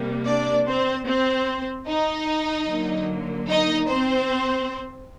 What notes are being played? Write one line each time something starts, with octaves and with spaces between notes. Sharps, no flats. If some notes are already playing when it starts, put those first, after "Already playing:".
Already playing: C3 G3 A#3
D4 D5
C4 C5
C4 C5
D#4 D#5
D3 F#3 A#3
D#4 D#5
C4 C5